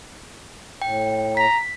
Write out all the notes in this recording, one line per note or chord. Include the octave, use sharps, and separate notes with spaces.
A2 G5
A#5 B6